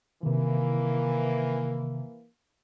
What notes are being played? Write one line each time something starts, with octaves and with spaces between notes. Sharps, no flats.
C3 D#3 E3 A#3